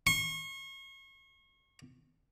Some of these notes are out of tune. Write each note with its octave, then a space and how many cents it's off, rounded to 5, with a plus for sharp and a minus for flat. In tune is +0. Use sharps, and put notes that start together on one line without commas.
C#6 -35